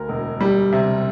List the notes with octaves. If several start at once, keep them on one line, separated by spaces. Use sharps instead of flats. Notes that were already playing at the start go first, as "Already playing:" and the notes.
Already playing: D2 A#4
E1
G3
C3